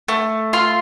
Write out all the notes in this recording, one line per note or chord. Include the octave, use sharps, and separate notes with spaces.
A3
F4 C6